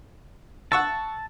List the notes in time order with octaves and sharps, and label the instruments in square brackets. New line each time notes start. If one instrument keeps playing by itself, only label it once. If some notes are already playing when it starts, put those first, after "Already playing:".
[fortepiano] F#5 C#6 E6 [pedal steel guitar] A5